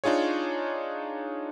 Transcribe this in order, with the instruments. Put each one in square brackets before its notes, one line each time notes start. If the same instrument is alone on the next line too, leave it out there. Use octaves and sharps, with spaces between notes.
[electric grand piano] D4 D#4 F4 G#4 C#5